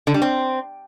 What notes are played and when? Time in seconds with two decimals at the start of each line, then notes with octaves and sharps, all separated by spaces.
0.07 D3
0.14 G3
0.22 C4